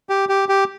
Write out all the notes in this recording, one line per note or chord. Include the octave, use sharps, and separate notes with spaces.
G4
G4
G4